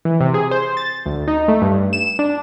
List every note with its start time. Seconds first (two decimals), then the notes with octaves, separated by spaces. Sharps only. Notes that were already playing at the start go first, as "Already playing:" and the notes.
0.05 E3
0.21 C3
0.34 G#4
0.51 C5
0.77 A6
1.06 D2
1.28 D#4
1.48 A3
1.62 G2
1.93 E7
2.19 D4